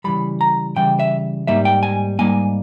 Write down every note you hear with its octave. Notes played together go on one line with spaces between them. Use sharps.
C#3 E3 G3 B5
A#5
C#3 E3 G3 G5
E5
G#2 G3 A#3 D#4 E5
G5
G#5
G#2 G3 A#3 D#4 G#5